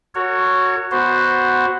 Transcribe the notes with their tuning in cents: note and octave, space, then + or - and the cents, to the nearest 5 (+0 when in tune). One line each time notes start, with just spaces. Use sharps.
F#4 -5 A#4 -45 C#5 +0
B3 +0 F#4 +0 C5 +0